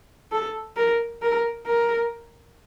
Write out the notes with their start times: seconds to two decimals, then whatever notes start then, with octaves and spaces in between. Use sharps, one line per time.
0.32 A4
0.76 A#4
1.22 A#4
1.66 A#4